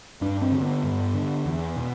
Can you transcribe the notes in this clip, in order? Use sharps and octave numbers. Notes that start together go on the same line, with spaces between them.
G2 D4
C4
D3
B3
G2
D3
E2
B2